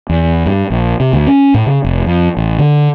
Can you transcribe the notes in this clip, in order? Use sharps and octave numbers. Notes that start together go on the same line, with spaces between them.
E2
G2
A#1
C3
D2
C#4
A2
C#3
F1
F2
A1
D3